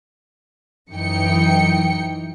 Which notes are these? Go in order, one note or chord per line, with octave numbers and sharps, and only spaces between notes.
F#2 E3 D#4 G5 C#7